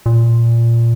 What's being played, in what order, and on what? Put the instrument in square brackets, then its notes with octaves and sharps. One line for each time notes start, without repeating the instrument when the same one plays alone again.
[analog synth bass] A#2